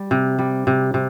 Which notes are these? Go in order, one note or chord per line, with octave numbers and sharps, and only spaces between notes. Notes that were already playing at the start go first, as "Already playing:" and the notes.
Already playing: G3
C3
G3
C3
C3